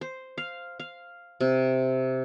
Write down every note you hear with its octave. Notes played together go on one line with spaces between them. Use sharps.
C5
F5
F5
C3